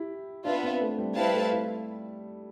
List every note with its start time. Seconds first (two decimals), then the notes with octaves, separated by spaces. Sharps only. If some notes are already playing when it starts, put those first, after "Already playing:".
Already playing: E4 G4
0.45 B3 D4 F4 B4 E5
0.63 C4
0.81 A3
0.98 G3
1.16 G3 C4 E4 B4 F5 A5
1.34 A3
1.52 E4